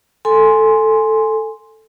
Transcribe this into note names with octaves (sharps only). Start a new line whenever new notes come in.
A4 G#5 C6